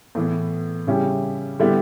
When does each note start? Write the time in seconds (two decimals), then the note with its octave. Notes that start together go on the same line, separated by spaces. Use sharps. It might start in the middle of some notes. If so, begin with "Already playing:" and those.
0.15 A2 E3 B3
0.87 C#3 G3 C#4 E4 G4
1.59 D3 G3 B3 E4 G4